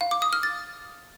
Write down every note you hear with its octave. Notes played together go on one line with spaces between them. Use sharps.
F5
D6
D#6
F6
A6